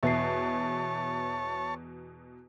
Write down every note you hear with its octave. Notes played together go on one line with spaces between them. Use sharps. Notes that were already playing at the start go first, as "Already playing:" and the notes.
E2 B2 C#5 E5 A5 C7